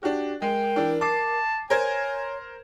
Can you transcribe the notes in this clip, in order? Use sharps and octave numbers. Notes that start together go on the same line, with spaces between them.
D4 F#4 G4
G#3 A#4 G5
E3 D4
A5 D6 C7
A#4 C5 C#5 G#5 G#6